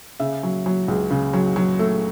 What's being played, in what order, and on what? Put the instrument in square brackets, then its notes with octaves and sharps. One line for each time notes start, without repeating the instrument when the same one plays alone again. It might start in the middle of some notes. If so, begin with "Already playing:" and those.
[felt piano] C#3 E5
F#3
F#3
C#2
C#3
F#3
F#3
A3